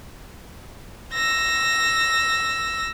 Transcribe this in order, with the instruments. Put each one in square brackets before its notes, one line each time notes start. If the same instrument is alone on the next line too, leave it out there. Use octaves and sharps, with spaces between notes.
[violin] E6 A#6